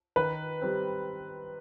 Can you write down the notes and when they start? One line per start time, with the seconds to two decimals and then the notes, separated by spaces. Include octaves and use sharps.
0.16 D#3 B4
0.62 G3 C4